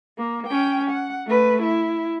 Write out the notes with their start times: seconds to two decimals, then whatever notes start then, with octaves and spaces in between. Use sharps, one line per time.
0.18 A#3
0.47 C#4 G5
0.90 F#5
1.27 A3 B4
1.62 E4